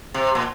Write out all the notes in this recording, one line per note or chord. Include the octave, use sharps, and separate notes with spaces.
C3
A#2